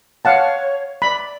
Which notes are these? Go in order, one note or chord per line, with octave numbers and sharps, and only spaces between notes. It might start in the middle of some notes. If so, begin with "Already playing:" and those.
C#5 F5 F#5 A5
D5 B5